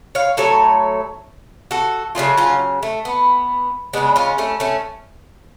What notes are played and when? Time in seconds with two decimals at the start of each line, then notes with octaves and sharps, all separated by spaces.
0.15 C#5 F5
0.37 A2 F#3 A3 A4 C#5
1.71 F#4 A4
2.15 C#3 F#3 A3 F4 G#4
2.37 C#4 F4
2.83 A3
3.05 B3
3.93 C#3 G#3 B3 D4
4.16 C#4 F4
4.38 A3 C#4
4.60 A3 C#4